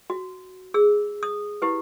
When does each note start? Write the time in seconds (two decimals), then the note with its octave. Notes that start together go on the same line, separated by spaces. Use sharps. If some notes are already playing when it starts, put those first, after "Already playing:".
0.10 F#4
0.74 G#4 E6
1.23 D#6
1.62 E4 G4 B4